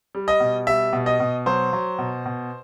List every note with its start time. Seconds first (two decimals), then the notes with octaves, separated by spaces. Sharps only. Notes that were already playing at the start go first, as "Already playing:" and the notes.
0.15 G3
0.28 D#5
0.40 B2
0.67 G3 E5
0.93 B2
1.06 D#5
1.20 B2
1.46 F#3 C5
1.73 F#3
1.98 B2
2.26 B2